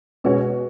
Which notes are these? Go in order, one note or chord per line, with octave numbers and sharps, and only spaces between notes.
B2 G#3 C#4 F#4 B4 C#5